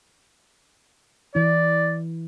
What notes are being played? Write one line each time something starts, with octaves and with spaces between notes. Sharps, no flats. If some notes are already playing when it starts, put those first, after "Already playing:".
E3 E4 D5